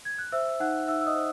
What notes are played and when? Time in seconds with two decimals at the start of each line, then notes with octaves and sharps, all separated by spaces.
0.05 G#6
0.19 F#6
0.32 C5 E5 E6
0.60 D#4 F#5 F#6
0.87 D#4 E5 E6
1.01 E6
1.06 D#5 D#6
1.15 C5